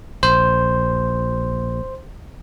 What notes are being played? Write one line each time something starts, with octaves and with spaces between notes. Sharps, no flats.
A#1 C5